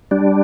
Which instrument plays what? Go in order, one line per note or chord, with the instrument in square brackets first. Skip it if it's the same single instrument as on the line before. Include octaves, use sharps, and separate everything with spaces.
[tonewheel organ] G3 D4